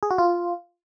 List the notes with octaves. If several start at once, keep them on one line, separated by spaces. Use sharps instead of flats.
G#4
F#4
F4